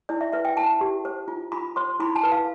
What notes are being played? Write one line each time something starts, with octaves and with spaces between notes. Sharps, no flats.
E4 D5
E5
B4 E5
G5
E4 A5
G4
C5
F4
F4 B5
C5 C6
E4 B5
A5
B4
F5